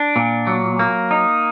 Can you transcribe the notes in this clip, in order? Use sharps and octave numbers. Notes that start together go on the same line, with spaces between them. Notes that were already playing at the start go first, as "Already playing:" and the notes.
Already playing: D4
A#2
F#3
A#3
D#4